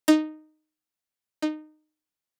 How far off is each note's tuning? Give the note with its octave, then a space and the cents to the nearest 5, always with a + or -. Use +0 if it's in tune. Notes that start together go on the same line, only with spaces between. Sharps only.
D#4 -10
D#4 -20